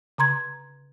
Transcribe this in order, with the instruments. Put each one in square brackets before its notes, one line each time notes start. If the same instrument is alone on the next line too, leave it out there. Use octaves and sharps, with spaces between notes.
[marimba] C#3 A#5 C6 G#6